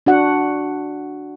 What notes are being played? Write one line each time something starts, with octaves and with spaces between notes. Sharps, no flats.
D4 F#4 F#5